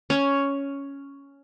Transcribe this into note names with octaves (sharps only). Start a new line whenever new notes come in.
C#4